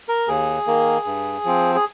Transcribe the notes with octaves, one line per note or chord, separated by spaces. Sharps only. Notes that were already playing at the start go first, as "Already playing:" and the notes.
A#4
D#2 G#4
D#3 A#3
G2
F3 C4
G#4